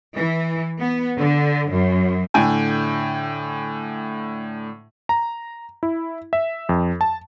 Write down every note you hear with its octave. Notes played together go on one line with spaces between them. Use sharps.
E3
B3
D3
F#2
A2 D3 G5 G#5
A#5
E4
E5
F2
A5